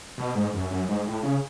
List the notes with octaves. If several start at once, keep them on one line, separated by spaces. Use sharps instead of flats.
B2
G#2
F#2
F#2
G#2
A2
C#3